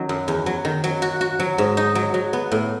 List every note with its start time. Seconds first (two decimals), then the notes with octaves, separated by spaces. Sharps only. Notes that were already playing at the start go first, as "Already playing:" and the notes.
Already playing: D#3 F#3 C#4
0.09 F#2
0.28 E2
0.46 F#3
0.65 D#3
0.84 F#3
1.02 F#4
1.21 F#4
1.40 F#3
1.58 G#2
1.77 D#4
1.95 F#3
2.14 F#3
2.33 B3
2.52 A2